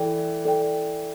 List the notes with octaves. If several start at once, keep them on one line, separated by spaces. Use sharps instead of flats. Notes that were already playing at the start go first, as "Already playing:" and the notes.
Already playing: E3 A4 D5 G5
A4 D5 G5